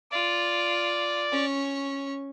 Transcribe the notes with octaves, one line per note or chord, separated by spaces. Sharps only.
F4 D5
C#4 C#6